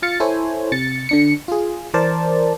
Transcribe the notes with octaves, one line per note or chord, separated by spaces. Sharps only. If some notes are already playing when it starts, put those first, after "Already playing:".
F4 F5 A6 C#7
E4 A4 C5 C#5 G#5
C3 A6 C#7
D3 D4 C#7
F4 G#4
E3 A#4 C5 D5 A5